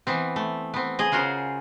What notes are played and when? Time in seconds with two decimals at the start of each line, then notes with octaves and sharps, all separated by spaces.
0.07 E3 B3 C4
0.36 A3
0.74 B3 C4
0.99 G#4 D#5
1.12 C#3 F4 F#4 A#4 C5